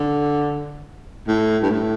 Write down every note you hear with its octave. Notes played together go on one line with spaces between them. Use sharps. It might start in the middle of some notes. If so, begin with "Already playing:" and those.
Already playing: D3
A2
G2
A2